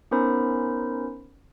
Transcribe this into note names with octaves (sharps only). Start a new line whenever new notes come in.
B3 C#4 D#4 A#4 C5 B5